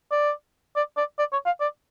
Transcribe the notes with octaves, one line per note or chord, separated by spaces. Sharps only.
D5
D5
D5
D5
C#5
F5
D5